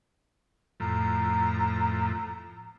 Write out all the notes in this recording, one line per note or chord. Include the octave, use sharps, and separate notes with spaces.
F2 A2 A#5